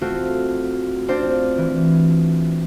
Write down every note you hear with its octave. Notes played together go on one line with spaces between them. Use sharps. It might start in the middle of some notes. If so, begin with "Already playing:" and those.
A3 C4 F4 F#4
C4 D4 F4 C5
E3